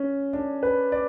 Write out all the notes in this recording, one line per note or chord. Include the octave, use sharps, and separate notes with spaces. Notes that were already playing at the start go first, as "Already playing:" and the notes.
Already playing: C#4
D4
B4
D5